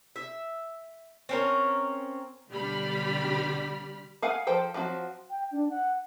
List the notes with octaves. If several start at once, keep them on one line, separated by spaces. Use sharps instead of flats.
E5
C4 C#4 A#4
B1 D3 G3 G4 B5 F6
G#4 F5 F#5 G#5
F3 A4 C5 G5
F3 F#3 C4 F#4
G5
D4
F#5